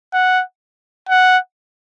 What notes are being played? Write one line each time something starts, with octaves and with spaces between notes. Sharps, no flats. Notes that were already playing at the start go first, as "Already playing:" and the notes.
F#5
F#5